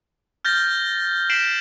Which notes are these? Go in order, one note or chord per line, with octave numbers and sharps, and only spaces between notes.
F6 G6 A6 A#6 G7
B6 C7 D7 E7 F#7